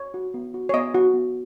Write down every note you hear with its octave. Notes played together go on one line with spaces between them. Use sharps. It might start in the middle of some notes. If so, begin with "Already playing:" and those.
Already playing: C#5
F#4
B3
F#4
C#5
B3 D#5
F#4
B3